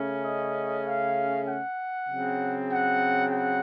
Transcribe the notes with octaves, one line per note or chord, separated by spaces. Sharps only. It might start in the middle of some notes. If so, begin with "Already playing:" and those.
Already playing: C#3 A3 C#4
D#5
F5
F#5
C#3 F#3 C4
F#5
F#5